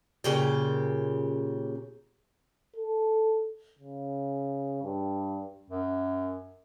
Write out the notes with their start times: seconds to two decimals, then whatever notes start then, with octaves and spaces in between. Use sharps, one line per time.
0.24 A#2 C#3 G4
2.76 A4
3.79 C#3
4.83 G2
5.70 F#2